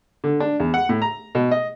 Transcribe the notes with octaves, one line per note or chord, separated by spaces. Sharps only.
D3
D4
E2
F#5
A2
A#5
B2
D#5